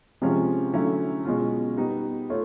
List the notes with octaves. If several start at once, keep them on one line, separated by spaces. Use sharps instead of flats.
C3 F3 G#3 C#4 F4
D3 F#3 A3 C#4 E4
B2 G#3 C#4 F4
G3 B3 D#4
A3 F4 C#5